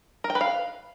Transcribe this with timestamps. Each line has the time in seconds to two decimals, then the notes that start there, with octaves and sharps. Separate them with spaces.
0.24 A#4
0.30 G5
0.35 B4
0.41 F5